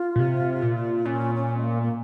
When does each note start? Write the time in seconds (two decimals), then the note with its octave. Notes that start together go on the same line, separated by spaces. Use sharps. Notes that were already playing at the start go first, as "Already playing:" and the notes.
Already playing: F4
0.16 A#2
0.19 C3
0.62 A#2
1.05 A#2 C#4
1.35 C#4
1.57 G#3
1.64 A#3
1.82 A#3